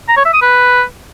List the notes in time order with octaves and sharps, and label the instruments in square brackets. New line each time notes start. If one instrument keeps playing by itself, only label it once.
[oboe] A#5
C#5
E5
D#6
B4